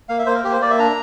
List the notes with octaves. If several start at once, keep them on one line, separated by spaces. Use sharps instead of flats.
A#3 F5
E5
A#3 C5
A#4
A#3 G4
C5
A#3 D5
E5
D4 A#5